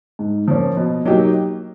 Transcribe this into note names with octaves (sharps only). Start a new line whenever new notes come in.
G#2
F3 A#3 C#4
B2
F#3 A#3 D#4 G4